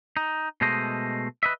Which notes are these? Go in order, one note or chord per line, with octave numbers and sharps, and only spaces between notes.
D#4
B2 G#3 A3 C5 D#5
B4 D#5 E5